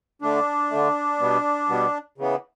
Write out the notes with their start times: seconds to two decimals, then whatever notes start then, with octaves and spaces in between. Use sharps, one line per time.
0.22 D3 A3 D4
0.71 D3 A3
1.20 B2 G3 B3
1.69 B2 G3 B3
2.18 C#3 E3 B3